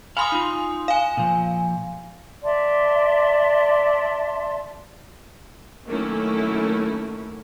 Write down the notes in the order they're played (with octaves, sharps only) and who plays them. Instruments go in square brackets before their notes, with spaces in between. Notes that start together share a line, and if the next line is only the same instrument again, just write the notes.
[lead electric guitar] F5 B5 [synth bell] G#5 C6 D#6
[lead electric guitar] D#4 F4
[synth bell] F5 G#5
[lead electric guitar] A#2 F3
[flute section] D5 E5 A5 C6
[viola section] D#3 F#3 A3 A#3 C#4 E4